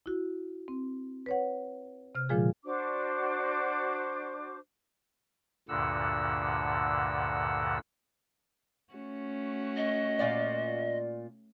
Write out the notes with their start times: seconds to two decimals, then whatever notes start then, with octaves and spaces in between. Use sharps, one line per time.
0.06 E4 F#4
0.68 C4
1.26 B4 C#5 F#5
2.15 C3 F6
2.29 A#2 D3 F3 G#3 F4 G#4
2.65 D4 F#4 C5 D6
5.68 D2 G2 A#2 D3 F#5 E6
8.94 A3 C#4 F#4
9.77 D#5
10.19 A#2 F4 D5